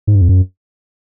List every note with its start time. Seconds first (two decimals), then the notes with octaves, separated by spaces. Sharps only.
0.07 G#2
0.15 G2
0.21 F2
0.29 F#2